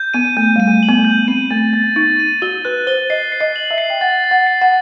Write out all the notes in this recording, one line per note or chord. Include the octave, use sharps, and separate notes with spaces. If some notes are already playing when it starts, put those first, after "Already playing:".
Already playing: G6
B3 D#7
A3 G6
G3 D#7
A3
F#7
B3
A3
G6
C4 D#7
A3 A6
B3 A6
D#4 A6
D#7
F#4 G7
B4 F#6
C5 G7
D#5 C7
C7
D#5
F#7
E5
C7
G5
F#5 A6
A6
F#5
C7
F#5